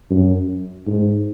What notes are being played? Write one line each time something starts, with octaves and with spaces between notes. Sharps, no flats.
F#2
G#2